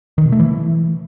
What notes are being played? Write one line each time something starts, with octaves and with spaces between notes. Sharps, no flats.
D#3
B2
A3
E3